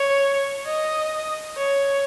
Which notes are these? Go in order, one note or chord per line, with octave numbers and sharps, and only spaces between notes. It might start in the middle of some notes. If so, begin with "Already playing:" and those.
Already playing: C#5
D#5
C#5